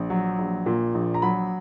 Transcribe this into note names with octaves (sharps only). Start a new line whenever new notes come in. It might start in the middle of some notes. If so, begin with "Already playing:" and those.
Already playing: A#1
F#3
A#1
A#2
A#1
A#5
F#3 B5